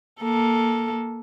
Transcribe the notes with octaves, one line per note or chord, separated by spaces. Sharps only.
A#3 A4